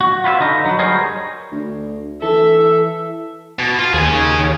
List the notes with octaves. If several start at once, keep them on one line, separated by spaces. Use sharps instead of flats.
F#4
F4 B4 C#5 E5
D3 D#4 D#5
F#3 B4
G3 G#4 A#4 C5 C#5 D#5
D2
E3 A4 E5
B2
F4
D#2 G#4 C#5